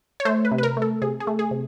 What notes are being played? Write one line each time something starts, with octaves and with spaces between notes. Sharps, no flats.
C#5
A3 C5
B4
C3
B4
A#4
A3
A4
C3 G#4
G#4
A3
G#4
C3